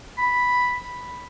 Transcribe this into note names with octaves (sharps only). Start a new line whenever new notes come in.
B5